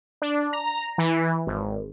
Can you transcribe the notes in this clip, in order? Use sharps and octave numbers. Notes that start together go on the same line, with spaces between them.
D4
A#5
E3
G#1